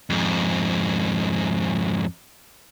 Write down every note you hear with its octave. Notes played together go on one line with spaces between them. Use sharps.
F2 G#2